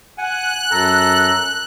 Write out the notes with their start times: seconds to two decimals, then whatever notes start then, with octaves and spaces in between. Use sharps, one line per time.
0.18 F#5 G#5 F#6
0.71 F#2 A4 A#5